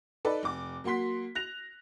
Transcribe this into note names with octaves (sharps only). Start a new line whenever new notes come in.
D#4 A4 B4 D5
F1 D6
F#3 A#3 F#4 C6 B6
F#6 A#6 F7